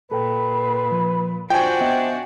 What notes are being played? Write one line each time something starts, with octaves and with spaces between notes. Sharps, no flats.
A#2 A4 B4 G5
F3
D4 F4 F#4 C5 G5 G#5
B3 D#5 E5